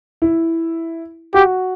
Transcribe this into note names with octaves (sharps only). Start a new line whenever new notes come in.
E4
F#4 G4